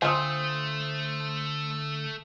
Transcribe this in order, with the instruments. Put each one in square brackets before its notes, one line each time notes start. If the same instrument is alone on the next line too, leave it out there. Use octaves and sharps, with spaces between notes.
[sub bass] D3 [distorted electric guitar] A3 [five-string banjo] C4 F4 G#5 [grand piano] C5 D#6